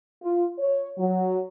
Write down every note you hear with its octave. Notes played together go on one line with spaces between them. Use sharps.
F4
C#5
F#3